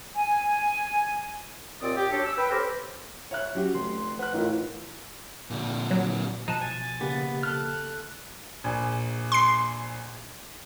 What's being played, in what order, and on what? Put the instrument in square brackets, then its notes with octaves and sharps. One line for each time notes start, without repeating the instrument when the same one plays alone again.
[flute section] G#5
[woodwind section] D#2 A#2 C4 D5 D#6
G4
C#4 D4 F#4 G4 A4 C#5
E6
B4 G5
C#4 G4 A4 A#4 C5
[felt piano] C#5 E5 F#6
[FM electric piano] F#3 [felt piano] C#4 F#4 G4
[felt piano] F1 [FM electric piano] C6
[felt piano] B4 F#6 [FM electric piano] F#5
[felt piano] A1 A2 E3 [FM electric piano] D#4 F4 A#4
[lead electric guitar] A#2 D3
[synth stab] F#3
[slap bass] B2 F3 [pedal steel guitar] D#4 A5 [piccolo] F#6
[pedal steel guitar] G#5 [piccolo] A6
[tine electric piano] C#3 A#3 G4 [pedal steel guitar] B3
[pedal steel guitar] A4 F6 [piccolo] F#6
[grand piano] A#1 G#5
[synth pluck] C6 C7